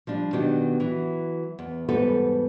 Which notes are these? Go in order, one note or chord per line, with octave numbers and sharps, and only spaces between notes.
F3 G3 D4
B2 D#3 F#3 B3 D4 G4
E3 F#3
E2
E2 G#2 G3 B3 A4 B4